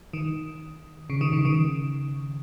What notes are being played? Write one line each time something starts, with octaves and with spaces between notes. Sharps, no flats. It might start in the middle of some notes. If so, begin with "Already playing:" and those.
D#3
C#3
D#3
C#3
D#3